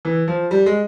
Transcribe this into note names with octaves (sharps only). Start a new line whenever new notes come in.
E3
F3
G3
G#3